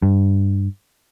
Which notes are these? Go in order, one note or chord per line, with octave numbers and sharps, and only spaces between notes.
G2